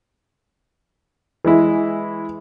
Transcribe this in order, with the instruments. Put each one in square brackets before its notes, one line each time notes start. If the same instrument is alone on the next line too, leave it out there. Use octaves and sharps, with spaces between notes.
[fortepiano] E3 G#3 E4